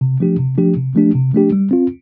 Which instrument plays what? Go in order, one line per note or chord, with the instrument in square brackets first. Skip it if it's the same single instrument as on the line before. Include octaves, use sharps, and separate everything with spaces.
[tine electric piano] C3
F3 A3 D4 G4
C3
F3 A3 D4 G4
C3
F3 A3 D4 G4
C3
F3 A3 D4 G4
G3
C4 F4